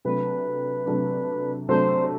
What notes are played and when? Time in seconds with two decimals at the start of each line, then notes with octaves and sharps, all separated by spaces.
0.05 C3 F#3 A3 D4 B4
0.86 C3 F#3 A3 D4
1.69 C3 F#3 A3 D4 C5